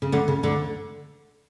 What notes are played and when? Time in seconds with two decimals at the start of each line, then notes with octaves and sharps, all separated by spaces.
0.02 C#3
0.12 D2 D3
0.28 C#3
0.43 D2 D3